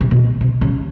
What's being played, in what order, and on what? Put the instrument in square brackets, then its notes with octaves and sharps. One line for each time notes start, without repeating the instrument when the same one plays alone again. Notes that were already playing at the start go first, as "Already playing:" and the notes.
[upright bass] C3
B2
C3
C#3